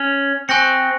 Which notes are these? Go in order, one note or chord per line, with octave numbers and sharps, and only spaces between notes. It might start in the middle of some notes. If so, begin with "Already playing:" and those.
Already playing: C#4
C4 G#5 C#6 F#6 A#6 C#7